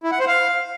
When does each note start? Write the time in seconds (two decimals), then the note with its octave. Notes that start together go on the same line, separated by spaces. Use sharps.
0.03 E4
0.11 F#5
0.19 C5
0.27 F5